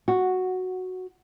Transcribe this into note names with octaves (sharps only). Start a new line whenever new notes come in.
F#4